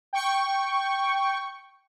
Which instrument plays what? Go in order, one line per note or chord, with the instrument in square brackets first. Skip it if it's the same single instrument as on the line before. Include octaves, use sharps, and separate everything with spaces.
[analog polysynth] G5 C#6